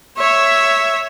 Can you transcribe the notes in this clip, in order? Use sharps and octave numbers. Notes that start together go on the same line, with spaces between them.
C#5 E5